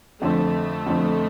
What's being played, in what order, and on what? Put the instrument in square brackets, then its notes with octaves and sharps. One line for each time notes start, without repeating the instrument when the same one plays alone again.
[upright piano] F2 D3 F3 C4 [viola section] A3
[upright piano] F2 D3 F3 C4